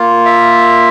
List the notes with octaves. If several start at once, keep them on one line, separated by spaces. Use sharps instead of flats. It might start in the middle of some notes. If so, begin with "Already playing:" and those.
Already playing: A#3 F4
E5